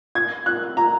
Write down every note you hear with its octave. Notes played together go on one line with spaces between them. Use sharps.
G#6
F#6
A#5